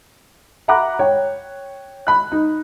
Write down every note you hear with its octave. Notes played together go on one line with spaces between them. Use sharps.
E5 F#5 A#5 B5 D6 F#6
C#5 G5
B5 F#6
D#4